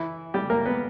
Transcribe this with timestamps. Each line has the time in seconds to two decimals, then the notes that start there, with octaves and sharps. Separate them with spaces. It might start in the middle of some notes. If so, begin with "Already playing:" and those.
Already playing: E3 E4
0.34 G3 G4
0.50 A#3 A#4
0.65 B3 B4